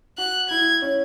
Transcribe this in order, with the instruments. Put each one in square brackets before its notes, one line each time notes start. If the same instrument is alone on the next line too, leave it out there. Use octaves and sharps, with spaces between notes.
[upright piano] F#4 [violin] F#6
[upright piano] E4 [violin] G#6
[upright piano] C#4